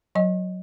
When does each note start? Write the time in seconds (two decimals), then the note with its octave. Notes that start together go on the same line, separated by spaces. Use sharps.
0.15 F#3 D#5